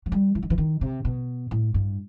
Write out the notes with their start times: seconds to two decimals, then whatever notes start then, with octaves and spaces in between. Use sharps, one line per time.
0.06 F#3
0.12 G3
0.35 E3
0.43 D#3
0.50 E3
0.58 D#3
0.81 C3
1.05 B2
1.51 A2
1.74 G2